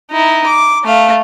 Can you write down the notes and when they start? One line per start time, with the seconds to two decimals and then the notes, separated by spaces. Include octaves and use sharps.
0.11 D#4 E4
0.46 D6
0.85 A3 F5